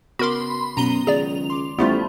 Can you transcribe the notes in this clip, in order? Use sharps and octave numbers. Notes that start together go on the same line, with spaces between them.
C#3 B3 F#4 A#4 B5 C6 D6
F#2 B2 B3 A#5 D#7 G7
C#2 D#3 F#3 G#4 D5 F7
C6 D6
A1 G3 A3 B3 E4 F4 G4 C5